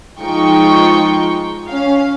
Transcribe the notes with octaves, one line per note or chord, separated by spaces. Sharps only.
F3 G#3 D#4 F4 G5 C#6
C#4 F5